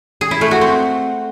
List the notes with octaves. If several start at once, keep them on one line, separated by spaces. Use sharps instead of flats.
G#4
E4
A3
F#4
C4